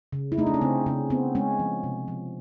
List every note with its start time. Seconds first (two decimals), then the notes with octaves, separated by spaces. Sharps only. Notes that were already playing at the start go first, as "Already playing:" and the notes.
0.13 C#3
0.32 E4
0.38 A3 D#4
0.47 D4
0.54 C#4
0.61 C#3 C4
0.86 C#3 C#4
1.10 B3 C4
1.35 G#3 C#4
1.59 F3
1.84 C3
2.08 F3